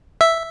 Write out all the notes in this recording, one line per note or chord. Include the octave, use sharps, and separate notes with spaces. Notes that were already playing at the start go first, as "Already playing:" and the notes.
E5